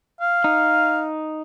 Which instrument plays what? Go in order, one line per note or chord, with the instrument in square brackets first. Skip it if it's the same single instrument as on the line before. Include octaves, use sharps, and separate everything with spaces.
[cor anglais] F5
[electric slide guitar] D#4